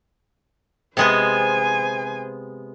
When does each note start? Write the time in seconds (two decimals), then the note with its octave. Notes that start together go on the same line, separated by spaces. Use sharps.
0.97 C3 G#3 B3 C5 G#5